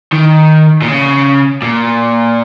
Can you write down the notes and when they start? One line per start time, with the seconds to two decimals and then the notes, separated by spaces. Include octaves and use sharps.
0.13 D#3
0.82 A#2
0.88 C#3
1.63 A#2